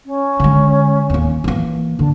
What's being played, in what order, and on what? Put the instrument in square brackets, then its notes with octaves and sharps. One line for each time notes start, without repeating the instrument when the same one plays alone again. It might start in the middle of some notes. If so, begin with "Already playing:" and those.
[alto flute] C#4
[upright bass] D3 G#3
D#2 A#3
E3 A#3
[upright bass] D3 [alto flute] D4